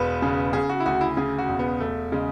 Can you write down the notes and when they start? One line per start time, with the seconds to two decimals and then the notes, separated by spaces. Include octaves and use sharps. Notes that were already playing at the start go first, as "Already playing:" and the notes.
Already playing: E1 B4
0.22 C#3
0.53 C#3 G#4
0.70 F#4
0.80 E4
0.86 D2 F#4
1.01 E4
1.17 C#3 G#4
1.38 F#4
1.48 E1
1.59 B3
1.80 E1 A3
2.12 C#3 G#3